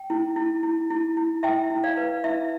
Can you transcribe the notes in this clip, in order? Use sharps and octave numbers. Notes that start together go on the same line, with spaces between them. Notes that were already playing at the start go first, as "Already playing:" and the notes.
Already playing: G5
E4
E4
E4
E4
E4
E4 E5 G5
E4
D5 F5
B4
E4 E5